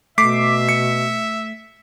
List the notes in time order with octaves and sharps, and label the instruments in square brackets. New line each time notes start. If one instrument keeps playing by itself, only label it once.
[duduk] B2 [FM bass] A3 [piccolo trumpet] E5 [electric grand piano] D6 B6 C7
[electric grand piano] C#7